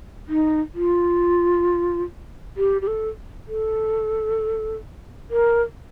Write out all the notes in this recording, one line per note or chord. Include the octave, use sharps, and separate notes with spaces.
D#4
F4
G4
G4
A4
A4
A#4